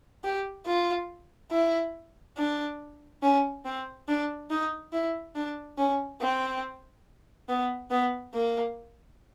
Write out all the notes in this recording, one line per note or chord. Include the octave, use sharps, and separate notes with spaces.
G4
F4
E4
D4
C#4
C4
D4
D#4
E4
D4
C#4
C4
B3
B3
A#3